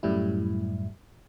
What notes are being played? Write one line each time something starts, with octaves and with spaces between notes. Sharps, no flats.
F#2 A2 G3 E4